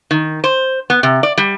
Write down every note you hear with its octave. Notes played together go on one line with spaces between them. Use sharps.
D#3
C5
B3
C3
D5
G3